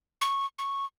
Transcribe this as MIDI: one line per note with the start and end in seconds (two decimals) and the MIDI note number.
0.21 0.46 85
0.59 0.85 85